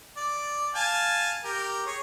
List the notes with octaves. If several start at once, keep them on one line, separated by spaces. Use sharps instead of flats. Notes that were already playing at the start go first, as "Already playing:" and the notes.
D5
F5 G#5 A5
G4 A#4
G#4 C#5